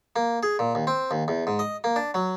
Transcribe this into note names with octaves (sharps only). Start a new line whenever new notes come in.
A#3
G#4
A#2
D#2
C4
D#2
E2
G#2
D#5
A#3
D4
F#3